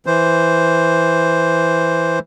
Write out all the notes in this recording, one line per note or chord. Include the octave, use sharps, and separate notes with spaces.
E3 C5